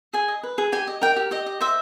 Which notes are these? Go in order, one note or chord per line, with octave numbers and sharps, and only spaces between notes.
G#4 G#5
D#5
B4
G#4
G4 G#5
D#5
A#4 G5
G4
G4 D#5
D#5
C5 E5